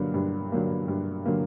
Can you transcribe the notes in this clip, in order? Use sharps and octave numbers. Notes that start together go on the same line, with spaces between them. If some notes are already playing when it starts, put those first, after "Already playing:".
Already playing: G2 D3 F#3 A#3
G2
D3 F#3 A#3
G2
D3 F#3 A#3